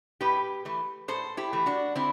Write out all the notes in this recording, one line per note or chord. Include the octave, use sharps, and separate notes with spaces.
A2 G4 B4
E3 A3
A2 A4 C5
E4 G4
E3 A3
D4 F#4
D3 C4 E4